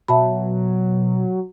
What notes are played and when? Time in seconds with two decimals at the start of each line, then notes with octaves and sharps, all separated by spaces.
0.08 B2 F#3 E5 A5 B5